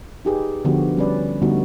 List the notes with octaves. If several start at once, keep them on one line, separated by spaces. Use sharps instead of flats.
D#4 G4 G#4 B4
D3 F3 B3 F#4 G4
G3 C#4 B4 D5
D3 G3 A3 B3 D#4 F#4